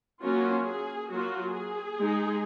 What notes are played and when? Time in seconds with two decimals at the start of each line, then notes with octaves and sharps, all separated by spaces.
0.21 F#3 A#3 C#4 F4 F#4
0.65 G#4
1.10 F#3 A#3 F4 F#4
1.54 G#4
1.98 G#3 D#4